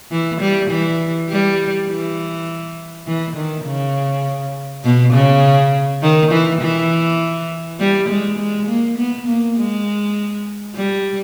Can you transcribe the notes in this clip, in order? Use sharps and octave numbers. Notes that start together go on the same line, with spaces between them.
E3
G3
E3
G3
E3
E3
D#3
C#3
B2
C#3
D#3
E3
E3
G3
G#3
G#3
A#3
B3
A#3
G#3
G3